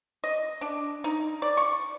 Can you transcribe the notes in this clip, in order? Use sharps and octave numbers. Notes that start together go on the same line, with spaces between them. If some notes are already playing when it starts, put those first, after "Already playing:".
D#5
D4
D#4
D5
C#6